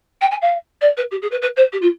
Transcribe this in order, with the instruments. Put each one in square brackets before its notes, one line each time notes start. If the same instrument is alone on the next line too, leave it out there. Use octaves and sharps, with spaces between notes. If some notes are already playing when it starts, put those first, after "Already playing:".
[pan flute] G5
G#5
F5
D5
B4
G4
G#4
B4
B4
C5
G4
F4